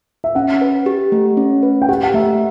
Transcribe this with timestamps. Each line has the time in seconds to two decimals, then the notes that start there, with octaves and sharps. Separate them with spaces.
0.24 E5
0.35 C#4 F#5
0.61 B4
0.86 G4
1.12 A3
1.37 C#4
1.63 B4
1.82 G5
1.89 G4 F#5
2.03 F#5
2.14 A3 E5